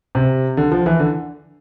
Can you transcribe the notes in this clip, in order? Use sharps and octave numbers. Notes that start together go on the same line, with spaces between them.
C3
D3
F3
E3
D3